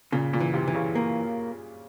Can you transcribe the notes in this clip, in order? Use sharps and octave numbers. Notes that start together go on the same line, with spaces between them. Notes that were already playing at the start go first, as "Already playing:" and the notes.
A#2 C#3
A#2
E3
C3
E3
C#3
A#3